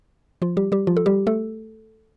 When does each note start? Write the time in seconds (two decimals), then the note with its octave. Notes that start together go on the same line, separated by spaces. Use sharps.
0.42 F3 F4
0.57 G3 G4
0.72 G3 G4
0.87 F3 F4
0.97 A4
1.06 G3 G4
1.27 A3 A4